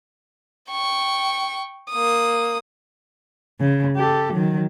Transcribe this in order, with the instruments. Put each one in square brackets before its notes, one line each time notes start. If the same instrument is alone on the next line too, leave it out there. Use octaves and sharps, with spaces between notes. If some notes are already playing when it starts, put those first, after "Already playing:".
[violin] G5 C#6
A#3 D#6
[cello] C#3
G4 A4
D#3 F#3